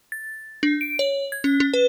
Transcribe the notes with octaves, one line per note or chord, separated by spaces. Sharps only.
A6
D4
D7
C#5
G#6
C#4
C#4
B4